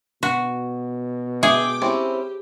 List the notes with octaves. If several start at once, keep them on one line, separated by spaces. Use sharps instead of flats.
B2 F#4
G#4 E5 G5 D6
C4 C#4 E4 G4